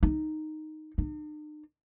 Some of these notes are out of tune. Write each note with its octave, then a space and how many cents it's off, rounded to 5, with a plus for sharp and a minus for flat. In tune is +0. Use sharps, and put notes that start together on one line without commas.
D#4 -5
D#4 -45